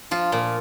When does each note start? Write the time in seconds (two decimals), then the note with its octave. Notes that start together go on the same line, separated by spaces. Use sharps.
0.11 F3 F4
0.32 A#2